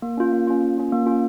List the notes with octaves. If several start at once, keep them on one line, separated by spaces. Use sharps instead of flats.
A#3
C#4 F4
A#3
C#4 F4
A#3
C#4 F4
A#3
C#4 F4